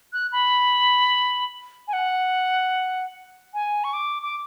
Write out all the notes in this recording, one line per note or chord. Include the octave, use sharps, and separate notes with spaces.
F#6
B5
G#5
F#5
G#5
C#6
D6
D6